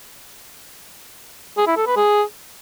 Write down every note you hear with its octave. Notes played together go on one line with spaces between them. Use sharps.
G#4
E4
A4
B4
G#4